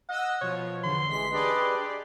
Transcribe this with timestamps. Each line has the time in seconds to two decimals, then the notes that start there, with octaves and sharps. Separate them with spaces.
0.09 D#5 F#5 E6
0.41 B2 F3 C#5
0.84 E2 D3 C6
1.07 A1 E3 G#3 B6
1.32 D4 G4 G#4 B4 D5 D#5